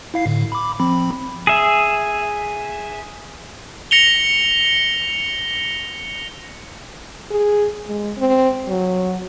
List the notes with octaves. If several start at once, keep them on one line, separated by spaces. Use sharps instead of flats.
E4 F5 C7
A2 D3
B5 D6
F3 C4 B5
G#4 E5
A#6 C#7 F7 G7
G#4
G#3
C4
F#3